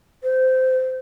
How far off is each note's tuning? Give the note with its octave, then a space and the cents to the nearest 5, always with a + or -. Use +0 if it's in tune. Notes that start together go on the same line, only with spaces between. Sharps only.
C5 -15